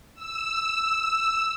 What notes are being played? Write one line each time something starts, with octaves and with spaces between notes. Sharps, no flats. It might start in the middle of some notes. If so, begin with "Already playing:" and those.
E6